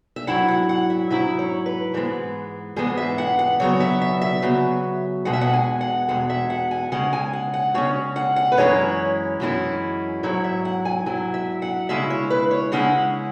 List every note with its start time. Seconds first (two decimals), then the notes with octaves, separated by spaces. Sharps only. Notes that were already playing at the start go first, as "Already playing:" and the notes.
0.16 E5
0.27 G#2 F#3 E4 F#5
0.48 F#5
0.69 F#5
0.90 E5
1.10 G#2 F#3 E4 E5
1.39 C#5
1.66 B4
1.94 G#2 E3 G#3 B3
2.76 G#2 E3 G#3 B3 G#4
2.97 E5
3.18 F#5
3.39 F#5
3.60 C#3 F#3 B3 C#5
3.80 E5
4.02 E5
4.22 E5
4.42 C#3 F#3 B3
5.25 E2 B2 G#3 F#5
5.33 E5
5.41 F#5
5.53 G#5
5.81 F#5
6.08 E2 B2 G#3 F#5
6.30 E5
6.50 F#5
6.71 G#5
6.92 C#3 G#3 C#4 F#5
7.13 G#5
7.33 F#5
7.54 F#5
7.74 C#3 G#3 C#4 C#5
8.16 F#5
8.36 F#5
8.52 B4
8.57 F#2 E3 G#3 C#4 E4 C#5
9.40 F#2 E3 G#3 C#4 E4
10.23 G#2 F#3 E4 C#5
10.44 E5
10.65 F#5
10.85 G#5
11.06 G#2 F#3 E4 G#5
11.34 E5
11.62 F#5
11.89 C#3 G#3 C#4 E4 E5
12.10 C#5
12.30 B4
12.51 C#5
12.72 C#3 G#3 C#4 E4 F#5